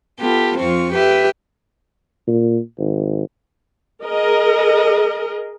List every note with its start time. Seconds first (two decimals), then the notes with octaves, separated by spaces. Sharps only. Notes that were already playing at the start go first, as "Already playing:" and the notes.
0.21 B3 F4 G4 A4
0.59 F2 C4 F4 C#6
0.93 G4 B4 E5
2.27 A#2
2.79 G#1
4.04 G#4 A#4 D#5